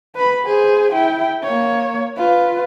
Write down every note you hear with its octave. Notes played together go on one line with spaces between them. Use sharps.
B4 B5
G#4 C5
E4 G5
A#3 C#5
F4 B4